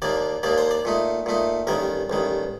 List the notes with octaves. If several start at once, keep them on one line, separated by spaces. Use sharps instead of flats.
D#2 D#3 A#3 D4 D5
D#2 D#3 A#3 D4 D5
C5
D5
A#2 A3 D#4
A#2 A3 D#4
A1 G2 D#3 A#4
A1 G2 D#3